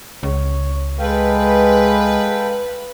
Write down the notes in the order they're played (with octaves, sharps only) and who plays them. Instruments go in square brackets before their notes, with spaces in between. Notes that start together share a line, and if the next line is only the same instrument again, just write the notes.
[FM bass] C#2 [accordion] C#5
[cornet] G#3 [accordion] A4 F5 G5 [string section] B4